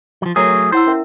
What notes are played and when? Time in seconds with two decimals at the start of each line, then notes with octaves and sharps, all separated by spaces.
0.22 F3 F#3
0.36 F#3 A3 G#4 A#4 C#5 A#5
0.72 E4 C5 F#5 E6
0.87 C#4 A#4 E5